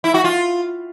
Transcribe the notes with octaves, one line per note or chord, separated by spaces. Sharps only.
E4
F#4
F4